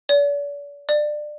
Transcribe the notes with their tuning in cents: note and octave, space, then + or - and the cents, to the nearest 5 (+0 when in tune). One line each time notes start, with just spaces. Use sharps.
D5 -40
D5 +25